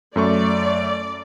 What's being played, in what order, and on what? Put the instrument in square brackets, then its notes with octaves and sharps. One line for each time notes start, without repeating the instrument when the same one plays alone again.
[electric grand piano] F#2 A3 C#6 [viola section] D5